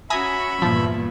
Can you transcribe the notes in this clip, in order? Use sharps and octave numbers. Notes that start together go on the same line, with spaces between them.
C#4 F#4 E5 G#5 A#5 B5 D#6
E2 G2 A#2 F3